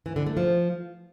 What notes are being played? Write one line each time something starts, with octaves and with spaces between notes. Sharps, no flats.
E3
D3
A3
F3